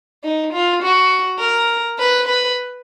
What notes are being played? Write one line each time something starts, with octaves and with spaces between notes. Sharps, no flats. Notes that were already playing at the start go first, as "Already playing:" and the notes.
D#4
F4
F#4
A#4
B4
B4